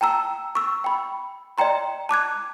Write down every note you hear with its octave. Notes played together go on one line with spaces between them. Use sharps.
G5 A5 A#5 E6
C#6 E6
G5 B5
D5 D#5 G5 A#5 C6
A5 D6 F#6 G#6